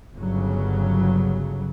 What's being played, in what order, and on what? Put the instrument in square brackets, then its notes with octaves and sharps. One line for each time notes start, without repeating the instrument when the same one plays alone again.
[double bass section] G1 C#3 F#3